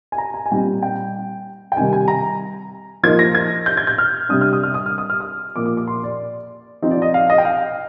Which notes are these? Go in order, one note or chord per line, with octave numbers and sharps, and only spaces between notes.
G#5
A#5
G#5
G#5
A#2 G3 C4 D#4 G5
G5
G5
C3 D#3 G3 G#5
G#5
A#5
F3 A#3 D#4 G#6
A#6
G#6
G6
G#6
G6
F6
C3 G3 D4 D#6
F6
D#6
F6
D#6
F6
D#6
F6
D#6
A#2 F3 A#3 D6
D6
D6
C6
D5
F3 C4 D#4
D5
D#5
F5
D#5
G5
F5